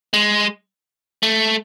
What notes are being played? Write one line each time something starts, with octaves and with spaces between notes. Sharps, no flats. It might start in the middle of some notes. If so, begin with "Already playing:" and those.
G#3
A3